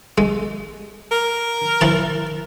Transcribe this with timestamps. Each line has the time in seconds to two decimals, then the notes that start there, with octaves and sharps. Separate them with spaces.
0.18 G#3
1.11 A#4
1.81 E3 A5